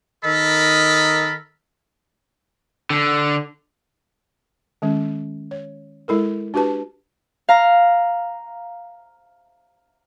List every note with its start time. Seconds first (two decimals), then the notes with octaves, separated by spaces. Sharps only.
0.25 D#3 A4 A#4 D#5 B5
2.90 D3
4.82 D#3 G#3 C#4
5.51 C#5
6.08 G#3 E4 A4 A#4
6.54 D4 F#4 G4 B4 A5
7.49 F5 A#5